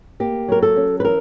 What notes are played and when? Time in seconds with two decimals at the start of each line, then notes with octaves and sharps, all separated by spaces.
0.20 A#3 G4
0.48 F#3 A#4
0.62 A4
0.76 C#4
1.00 B4
1.05 E3 A#4